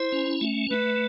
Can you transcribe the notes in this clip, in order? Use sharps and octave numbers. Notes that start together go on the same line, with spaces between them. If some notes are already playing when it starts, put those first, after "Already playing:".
Already playing: E4 C5
C#4
A3
A3 B4